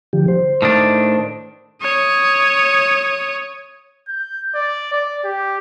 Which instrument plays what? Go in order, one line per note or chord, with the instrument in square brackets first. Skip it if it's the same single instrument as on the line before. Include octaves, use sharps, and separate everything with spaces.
[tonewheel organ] D3 F3 G4
C5
[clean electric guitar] A2 D#3 D4
[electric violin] C#5 D#6
[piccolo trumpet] G6
D5
D5
G4